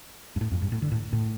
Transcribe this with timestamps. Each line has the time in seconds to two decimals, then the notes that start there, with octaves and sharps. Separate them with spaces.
0.36 G2
0.41 A2
0.51 F2
0.62 G2
0.72 A2
0.82 D3
0.92 A2
1.13 A2